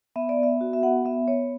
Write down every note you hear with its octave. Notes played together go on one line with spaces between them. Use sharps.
B3 E5
D5
B3 E5
F#4
E5
B3 F#5
B3 E5
B3 C#5